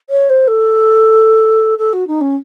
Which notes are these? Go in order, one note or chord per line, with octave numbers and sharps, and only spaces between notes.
C#5
C5
A4
A4
F#4
D#4
C#4